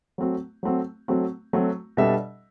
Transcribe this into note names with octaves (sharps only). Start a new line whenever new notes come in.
F#3 A3 C4 F#4
F#3 A3 C4 F#4
F#3 A3 C4 F#4
F#3 A3 C4 F#4
B2 G3 D4 A4 E5